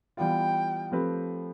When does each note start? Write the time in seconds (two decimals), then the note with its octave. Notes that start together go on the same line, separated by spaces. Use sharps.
0.17 E3 G3 B3 F4 G5
0.92 F3 A3 C4 G4 B4